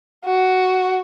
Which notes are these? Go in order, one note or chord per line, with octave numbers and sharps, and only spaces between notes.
F#4